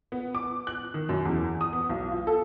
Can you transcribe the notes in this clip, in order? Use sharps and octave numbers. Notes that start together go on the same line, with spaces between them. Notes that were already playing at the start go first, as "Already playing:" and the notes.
B3
D6
F#6
D#3
F#2
E2
D#6
B3
B1
F4
A4